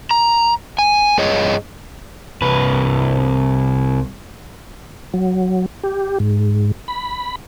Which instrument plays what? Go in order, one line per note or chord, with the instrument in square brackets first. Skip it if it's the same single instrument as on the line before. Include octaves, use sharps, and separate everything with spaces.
[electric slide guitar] A#5
G#5
G2 G#4 C#5 D#5
[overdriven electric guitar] C2 B4
[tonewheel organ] F#3
G4
G#2
B5